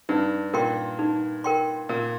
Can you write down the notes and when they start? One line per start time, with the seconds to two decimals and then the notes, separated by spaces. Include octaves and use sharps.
0.09 G2 D#4
0.53 A#2 A#4 G5 C6
0.99 D#4
1.44 A#4 G5 C6
1.89 A#2 A#4